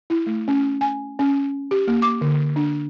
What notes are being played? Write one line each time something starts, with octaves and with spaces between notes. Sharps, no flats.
E4
A3
C#4
G#5
C#4
G4
A#3
D6
D3
D4